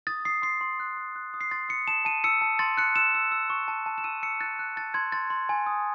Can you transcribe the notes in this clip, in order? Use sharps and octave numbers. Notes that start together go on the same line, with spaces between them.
D#6 A6
D#6 C7
C6 C7
C6
F#6
C6
F#6
D#6
C7
C6 A6
D#6 C#7
A5 E7
A5 D#7
E6 C#7
A5
C6 A6
F#6 C#7
E6 E7
E6
E6
C#6
A5
A5
E7
E6 D#7
E6 C#7
F#6 A6
F#6
A5 A6
C6 G#6
C6 A6
C6
G#5
D#6